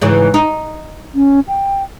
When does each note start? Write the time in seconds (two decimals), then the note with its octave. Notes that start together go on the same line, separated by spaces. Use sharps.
0.01 G#2 C#3 E3
0.34 D#4
1.15 C#4
1.48 G5